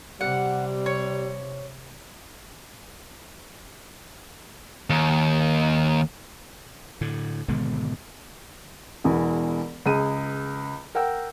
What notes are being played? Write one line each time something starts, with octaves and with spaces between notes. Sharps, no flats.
C3 G3 F#5
C#5
D#2
A2 D3
G#1 B2 D3 G#3
E1 E2 E3
C#2 G#4 D#7
A#4 F#5 G5 E6